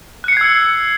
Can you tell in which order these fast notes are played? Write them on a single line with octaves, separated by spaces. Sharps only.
F#6 C#7 C7 G#6 E6